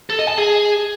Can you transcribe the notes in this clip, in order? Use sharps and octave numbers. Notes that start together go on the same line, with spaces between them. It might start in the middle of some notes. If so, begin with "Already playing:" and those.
A4
D#5
A5
G#4